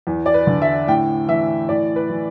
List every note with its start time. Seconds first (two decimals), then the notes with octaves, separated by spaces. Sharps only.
0.07 E2
0.26 D5
0.34 B4
0.47 D3
0.62 E5
0.87 A2 G5
1.28 E3 E5
1.69 A2 D5
1.96 B4
2.09 E3